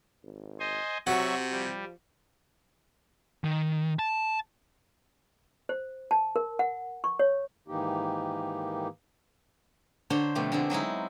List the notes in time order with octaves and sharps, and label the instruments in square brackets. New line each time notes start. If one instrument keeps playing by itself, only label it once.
[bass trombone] G#1
[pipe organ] C5 D#5 G#5
[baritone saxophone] C3 [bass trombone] F#3 [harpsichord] F#4 [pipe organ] E5 C#6
[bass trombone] F3 [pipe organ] G3
[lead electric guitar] D#3
A5
[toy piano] C5
A5
A#4
F#5
C#6
C#5
[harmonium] G#2 D#3 E3 A#3 D#4 G4
[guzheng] D3 D4 C5 C#5 A#5 C6
F2 B2 A3 G4
D3 G#3 A3 B3 C4 E4
F#3 G#3 D#4 E4